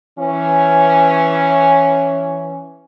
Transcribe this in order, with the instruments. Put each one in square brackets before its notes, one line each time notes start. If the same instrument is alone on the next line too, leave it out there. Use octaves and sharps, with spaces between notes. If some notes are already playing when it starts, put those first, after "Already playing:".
[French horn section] E3 C#4